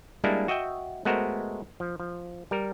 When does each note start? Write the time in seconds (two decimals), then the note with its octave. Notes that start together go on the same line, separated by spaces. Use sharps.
0.24 G3 G#3 A#3 D4 E4
0.48 F#4 D#5 E5 G5
1.05 G#3 A3 B3 F#4 A#4 C5
1.80 F3
2.00 F3
2.51 G3 A#4